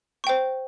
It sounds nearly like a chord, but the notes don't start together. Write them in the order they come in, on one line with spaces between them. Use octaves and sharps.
C#6 G5 C5